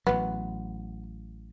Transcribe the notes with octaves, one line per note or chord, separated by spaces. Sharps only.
A1 F#3 B3